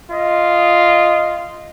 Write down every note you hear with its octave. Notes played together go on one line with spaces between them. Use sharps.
F4 D#5